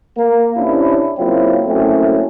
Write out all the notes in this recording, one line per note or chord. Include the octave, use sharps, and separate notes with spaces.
A#3
C3 C#4 D4 E4
C#3 F#3 A#3 C4 E4 F4
F#3 A3 A#3 C4 C#4 E4